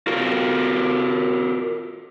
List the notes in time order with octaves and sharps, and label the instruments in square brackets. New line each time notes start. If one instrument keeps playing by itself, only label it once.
[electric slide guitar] F4 F#4 A#4